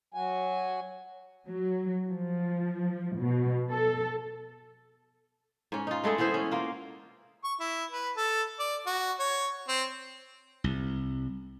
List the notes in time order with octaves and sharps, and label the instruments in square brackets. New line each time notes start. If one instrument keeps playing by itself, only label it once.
[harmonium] F#3 F#4 G#5
[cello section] F#3
F3
B2
A4
[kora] G#2 C#4
D#4 F4
G#3 A3 E4 G#4
E3 B3 E4 C5
C#4
A#3 F4
[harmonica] C#6
E4
B4
A4
D5
F#4
C#5
C4
[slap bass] C2